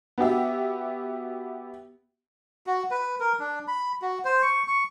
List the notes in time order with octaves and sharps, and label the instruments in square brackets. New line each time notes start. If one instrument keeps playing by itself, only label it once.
[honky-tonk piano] B3 F#4 G4 E5
[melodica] F#4
B4
A#4
D4
B5
F#4
C5
C#6
C#6